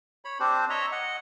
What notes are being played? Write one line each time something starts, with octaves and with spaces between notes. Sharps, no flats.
C#5 B5
C4 D4 G4 C5
C#5 D#5 E5 A#5
D#5 F#5